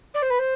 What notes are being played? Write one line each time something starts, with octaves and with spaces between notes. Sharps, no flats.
D5
C5
B4
C5